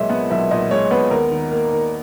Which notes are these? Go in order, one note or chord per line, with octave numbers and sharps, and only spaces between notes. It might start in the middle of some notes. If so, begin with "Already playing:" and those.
Already playing: B1 A#2 G#3 C#5 D#5 E5
B3 F#5
B1 E5
A#2 D#5
G#3 C#5
B3 B4
D#2 A#4
D#3
A#3
D#2